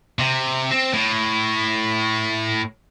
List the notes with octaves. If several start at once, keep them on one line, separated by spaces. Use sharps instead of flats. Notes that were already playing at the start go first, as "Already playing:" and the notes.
C3
C4
A2